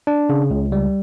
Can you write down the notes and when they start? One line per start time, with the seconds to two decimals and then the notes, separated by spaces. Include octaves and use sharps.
0.07 D4
0.29 C#3
0.50 C#2
0.72 G3